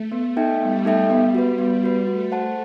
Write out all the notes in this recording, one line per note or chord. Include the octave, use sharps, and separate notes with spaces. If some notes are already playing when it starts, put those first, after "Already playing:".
Already playing: A3
B3
D#4 A4 E5 G5
G3 B3
D#4 A4 E5 G5
B3
F#4 B4
G3 B3
F#4 B4
A3 F#4
C5 F#5 A5